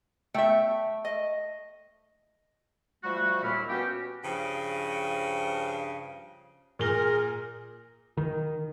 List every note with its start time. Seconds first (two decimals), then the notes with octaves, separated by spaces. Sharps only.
0.34 A3 E5 G5
1.05 D#5
3.03 F3 G3 A3 F#4
3.43 D#2 A#2 A#3 E4 B5 F6
3.69 B3 C#4 F#4 G4
4.23 G2 C#3 F3
6.79 A#2 G#4 A#4 G7
8.17 D#3